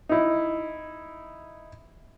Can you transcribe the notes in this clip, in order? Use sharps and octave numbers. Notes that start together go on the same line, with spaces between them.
D#4 E4